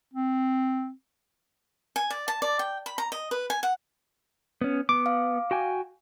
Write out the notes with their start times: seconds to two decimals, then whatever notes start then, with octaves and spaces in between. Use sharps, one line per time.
0.14 C4
1.96 G#5
2.10 D5
2.28 A5
2.42 D5
2.59 G5
2.86 B5
2.98 A#5
3.12 D#5
3.31 B4
3.50 G#5
3.63 F#5
4.61 B3 C#4
4.89 B3 D6
5.06 F5
5.51 F#4 G5 G#5